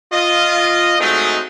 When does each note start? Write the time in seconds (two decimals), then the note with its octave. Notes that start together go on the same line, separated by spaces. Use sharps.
0.12 F4 D#5
1.00 F#3 G#3 A3 C4 D#4